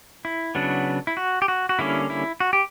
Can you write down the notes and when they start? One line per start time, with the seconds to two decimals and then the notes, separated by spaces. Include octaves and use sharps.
0.25 E4
0.55 C#3 F#3 B3 D4
1.07 E4
1.17 F#4
1.42 G4
1.48 F#4
1.69 F#4
1.79 D3 G3 A#3 C#4 E4
2.10 E4
2.40 F#4
2.53 G4